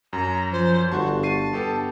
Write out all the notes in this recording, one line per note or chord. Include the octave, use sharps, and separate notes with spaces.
F#2 A#5
F3 C5
G1 F#4 A5 C6
A5 C#6 C7 D#7
G2 B3 G4 A4